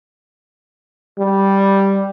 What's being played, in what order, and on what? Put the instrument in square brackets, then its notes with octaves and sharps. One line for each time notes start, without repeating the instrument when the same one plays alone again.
[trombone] G3